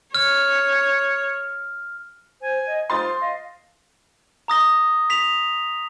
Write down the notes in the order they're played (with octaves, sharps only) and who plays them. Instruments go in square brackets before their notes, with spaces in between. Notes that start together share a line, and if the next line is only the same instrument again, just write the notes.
[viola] C#5 [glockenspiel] F6
[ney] C5 [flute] G#5
[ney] D#5
[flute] F4 [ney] C5 [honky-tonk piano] C6 D#6 A6
[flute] D#5 [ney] F5
[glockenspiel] A#5 D#6 A#6 G7
B6 F7